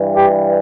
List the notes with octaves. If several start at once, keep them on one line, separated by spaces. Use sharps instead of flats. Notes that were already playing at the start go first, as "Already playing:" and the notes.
Already playing: G2 E3 G3
G4